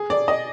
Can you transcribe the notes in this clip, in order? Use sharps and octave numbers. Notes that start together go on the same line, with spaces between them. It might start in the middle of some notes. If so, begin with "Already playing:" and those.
Already playing: G#4
D5
D#5